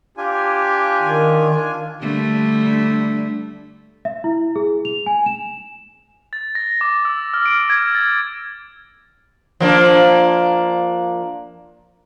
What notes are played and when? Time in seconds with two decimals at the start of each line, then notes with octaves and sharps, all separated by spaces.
0.17 D4 F4 G4 G#5
1.02 D#3
2.02 D3 G3 A3
4.05 E5
4.24 E4
4.56 G#4
4.85 F7
5.06 G#5
5.26 E7
6.33 A6
6.55 A#6
6.81 D6
7.05 E6
7.34 F6
7.46 D7
7.70 G#6
7.95 A6
9.60 F3 A#3 D4